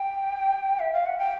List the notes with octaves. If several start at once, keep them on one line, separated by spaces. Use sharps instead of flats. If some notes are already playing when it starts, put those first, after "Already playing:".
Already playing: G5
E5
F5
F#5
G5